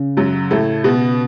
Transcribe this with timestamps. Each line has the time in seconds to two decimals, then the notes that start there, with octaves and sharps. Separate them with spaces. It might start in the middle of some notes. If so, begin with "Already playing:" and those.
Already playing: C#3 C#4
0.17 F#2 F#3
0.50 A2 A3
0.84 B2 B3